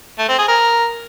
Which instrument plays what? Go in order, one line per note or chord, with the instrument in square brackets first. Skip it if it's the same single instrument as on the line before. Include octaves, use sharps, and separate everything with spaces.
[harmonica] A3
C4
G#4
A#4